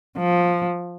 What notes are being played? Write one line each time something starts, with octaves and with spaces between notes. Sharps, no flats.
F3